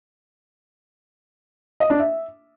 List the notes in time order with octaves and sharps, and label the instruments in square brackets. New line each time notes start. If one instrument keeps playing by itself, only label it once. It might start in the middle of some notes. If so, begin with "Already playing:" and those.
[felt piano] D#5
D4
E5